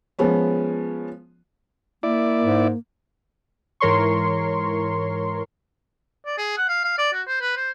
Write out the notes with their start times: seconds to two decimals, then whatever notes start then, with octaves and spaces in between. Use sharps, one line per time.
0.19 F3 G#3 B3 C#4
2.03 A#3 E4 D5
2.44 G#2
3.80 G#2 E3 A#4 C#5 C6 C#6
6.26 D5
6.38 G#4
6.57 F#5
6.69 F5
6.84 F5
6.98 D5
7.13 F#4
7.27 C5
7.41 B4
7.57 C5